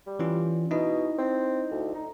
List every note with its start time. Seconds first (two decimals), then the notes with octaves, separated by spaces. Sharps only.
0.06 G3
0.19 E3 C#4 F4
0.71 B2 D#4 E4 D#5
1.18 C4
1.70 D2
1.94 D#4